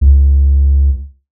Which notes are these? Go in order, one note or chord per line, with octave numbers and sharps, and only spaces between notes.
C#2